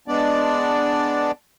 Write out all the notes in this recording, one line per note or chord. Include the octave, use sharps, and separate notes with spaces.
G#3 B3 D4 D5